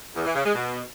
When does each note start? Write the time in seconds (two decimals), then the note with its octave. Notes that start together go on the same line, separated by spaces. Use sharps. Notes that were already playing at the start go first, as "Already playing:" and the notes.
0.16 E2
0.26 E3
0.36 C#3
0.45 G#3
0.55 B2